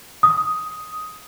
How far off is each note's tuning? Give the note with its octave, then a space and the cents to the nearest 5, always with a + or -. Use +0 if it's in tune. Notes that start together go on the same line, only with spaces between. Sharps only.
D#6 +5